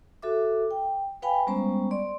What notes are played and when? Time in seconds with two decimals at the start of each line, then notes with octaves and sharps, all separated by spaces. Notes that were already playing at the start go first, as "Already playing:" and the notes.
0.22 F#4 A4 E5 D6
0.71 G5
1.22 B4 F5 G5 G#5 B5
1.47 G3 G#3 B3 C#4 C5 A#5
1.91 D5 C6